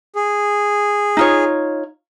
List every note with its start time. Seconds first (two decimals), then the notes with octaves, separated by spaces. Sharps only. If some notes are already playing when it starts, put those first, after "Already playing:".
0.16 G#4
1.17 D#4 F4 C#5